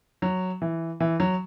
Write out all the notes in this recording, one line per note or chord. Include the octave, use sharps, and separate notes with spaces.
F#3
E3
E3
F#3